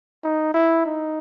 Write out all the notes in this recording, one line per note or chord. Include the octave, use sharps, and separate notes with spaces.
D#4
E4
D#4